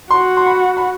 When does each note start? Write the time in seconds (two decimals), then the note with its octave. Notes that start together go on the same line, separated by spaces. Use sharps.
0.11 F#4 C6
0.37 C6
0.46 B5
0.77 B5